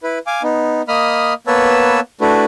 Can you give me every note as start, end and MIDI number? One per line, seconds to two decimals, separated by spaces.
0.03 0.19 64
0.03 0.19 71
0.27 0.42 77
0.27 0.42 80
0.27 0.42 86
0.43 0.82 59
0.43 0.82 63
0.88 1.34 58
0.88 1.34 75
0.88 1.34 83
0.88 1.34 87
0.88 1.34 89
1.47 2.00 58
1.47 2.00 59
1.47 2.00 71
1.47 2.00 73
1.47 2.00 81
1.47 2.00 88
2.21 2.45 57
2.21 2.45 62
2.21 2.45 64
2.21 2.45 66
2.21 2.45 71